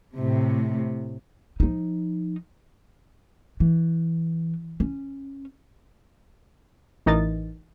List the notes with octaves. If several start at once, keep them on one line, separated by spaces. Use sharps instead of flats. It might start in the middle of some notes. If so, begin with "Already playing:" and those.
A2 C3
F3 D#4
E3
C#4
A1 E3 D#4 A#4 D#5 A6